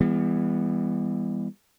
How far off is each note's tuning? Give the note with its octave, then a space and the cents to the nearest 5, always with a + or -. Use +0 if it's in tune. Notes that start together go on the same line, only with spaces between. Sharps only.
E3 +0 G3 +40 B3 +0